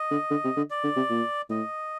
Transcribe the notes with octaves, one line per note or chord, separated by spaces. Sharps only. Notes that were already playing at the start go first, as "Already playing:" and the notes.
Already playing: D#5
D3
D3
C3
D3
D5
D3
C3
A#2
A2 D#5